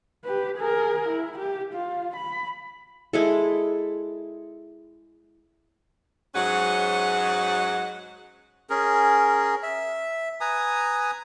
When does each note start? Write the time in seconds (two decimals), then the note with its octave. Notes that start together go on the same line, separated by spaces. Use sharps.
0.24 G4 B4
0.57 G#4 A#4
1.08 E4
1.38 G4
1.73 F4
2.16 B5
3.13 G#3 E4 A4
6.35 G#2 F#3 C#4 B4 D#5 F#5
8.70 C#4 G#4 A#4
9.63 E5
10.41 B4 G#5 A#5 D#6